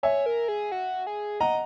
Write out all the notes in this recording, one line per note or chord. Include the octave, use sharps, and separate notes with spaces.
C#5 E5 G#5
A#4
G#4
F#4
G#4
D#5 F#5 A#5